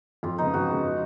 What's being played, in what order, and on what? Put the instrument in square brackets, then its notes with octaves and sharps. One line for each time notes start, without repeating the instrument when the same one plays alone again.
[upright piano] F2 [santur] F4
[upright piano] C#3 G#3 B3 [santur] D#4
[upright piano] F2 [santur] F#4
[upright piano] C#3 G#3 B3
F3